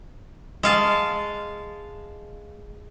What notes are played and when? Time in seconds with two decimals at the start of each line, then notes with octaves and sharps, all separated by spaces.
0.63 G#3 F5 A5